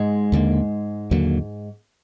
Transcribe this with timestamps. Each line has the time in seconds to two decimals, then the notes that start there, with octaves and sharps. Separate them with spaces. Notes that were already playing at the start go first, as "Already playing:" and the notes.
Already playing: G#2 G#3
0.32 D#2 D3 F#3 A#3
1.11 D#2 D3 F#3 A#3